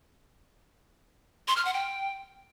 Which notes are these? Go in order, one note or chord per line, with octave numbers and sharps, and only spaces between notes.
C6
F6
F#5
G5